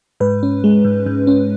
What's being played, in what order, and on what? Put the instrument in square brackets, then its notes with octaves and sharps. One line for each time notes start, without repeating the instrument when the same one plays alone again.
[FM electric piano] G#2 B4
C#4
G#3
G#2
G#2
C#4